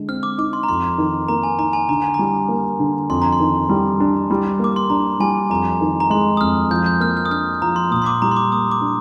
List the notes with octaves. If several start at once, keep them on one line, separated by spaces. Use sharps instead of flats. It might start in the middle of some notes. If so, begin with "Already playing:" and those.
Already playing: D3 G#3
C4 F6
D6
D#4 D6
C6
A#5
F2 C6
D#3
A#3 A#5
G#5
D#4 A#5
G#5
D3 A#5
G#5
G3 A#5
A#3
D3
F2 C6
A#5
C6
D#3
G3
D4
G3
A#3 D6
C6
D4 A#5
G3 G#5
F2 A#5
D#3
A#5
G#3 C6
D#6
F2 F6
F3 G6
G6
A#3 F6
F6
D#6
D4 F6
F3 A#5
C6
A#2 D#6
C6
D6
G3 A#5
C6
D6
A#3 D#6
D6
D4